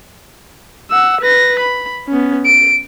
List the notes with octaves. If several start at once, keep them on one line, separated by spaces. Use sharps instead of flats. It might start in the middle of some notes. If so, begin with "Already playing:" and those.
F#5 E6
B4 A#6
B5
B3 C#4
D7